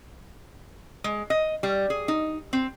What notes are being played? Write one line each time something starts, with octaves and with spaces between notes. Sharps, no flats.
G#3
D#5
G3
G#4
D#4
C4